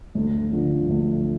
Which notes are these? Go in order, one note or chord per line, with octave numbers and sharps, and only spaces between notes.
D2
D3 F3
D2